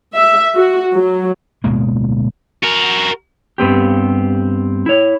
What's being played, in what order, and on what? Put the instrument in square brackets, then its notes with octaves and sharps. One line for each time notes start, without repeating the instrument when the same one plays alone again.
[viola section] E5
F#4
F#3
[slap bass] D1 B2 G#3 A#3
[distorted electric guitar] F#4 A#4
[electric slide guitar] G2 B3 C4 G4
E4 C#5